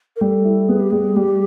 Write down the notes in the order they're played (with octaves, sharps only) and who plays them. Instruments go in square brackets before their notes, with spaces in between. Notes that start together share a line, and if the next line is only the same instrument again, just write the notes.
[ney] A#4
[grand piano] G3 [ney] A4
[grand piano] E4
[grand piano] B3 [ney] G#4
[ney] G4
[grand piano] G3 [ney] G#4
[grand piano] G3 [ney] G4